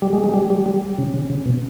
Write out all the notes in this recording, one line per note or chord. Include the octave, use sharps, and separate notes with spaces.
G3
G#3
G#3
G3
G3
G3
C#3
C#3
C#3
B2